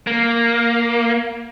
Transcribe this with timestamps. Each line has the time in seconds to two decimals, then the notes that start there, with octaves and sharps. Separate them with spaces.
0.07 A#3